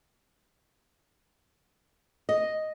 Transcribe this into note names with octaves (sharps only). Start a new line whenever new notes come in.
D#5